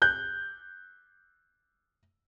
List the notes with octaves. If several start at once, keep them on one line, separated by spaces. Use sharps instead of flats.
F#6 G6